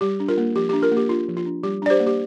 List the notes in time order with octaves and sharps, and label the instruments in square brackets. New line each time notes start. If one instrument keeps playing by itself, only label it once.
[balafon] G3 G4
D4
F4 A#4
A#3
F3 G4
D4 G4
F4 A#4
A#3 G4
D4 F4
F3
F4
D4
G3 G4
D4 D5
G4 C5
A#3
G4